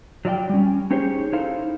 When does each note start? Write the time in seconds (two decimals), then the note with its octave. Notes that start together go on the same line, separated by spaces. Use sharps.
0.25 F#3 F4 D5 F5 G5
0.50 G3 C#4
0.91 C#4 D#4 G4 G#4 C5 C#5
1.33 D#4 E4 A4 C5 F5